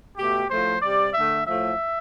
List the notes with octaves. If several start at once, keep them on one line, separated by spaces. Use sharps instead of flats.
B2 A3 G4
A2 F3 A3 C5
C3 G3 D5
D3 A3 E5
A2 F3 A3 E5